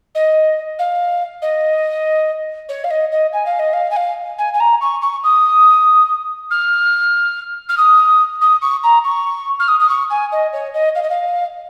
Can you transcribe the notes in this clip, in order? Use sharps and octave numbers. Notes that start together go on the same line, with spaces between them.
D#5
F5
D#5
C#5
F5
D#5
D#5
G#5
F5
D#5
F5
G#5
F5
G#5
G#5
A#5
C#6
C#6
D#6
F6
F6
D#6
D#6
C#6
A#5
C#6
F6
D#6
D#6
C#6
G#5
D#5
C#5
D#5
F5
D#5
F5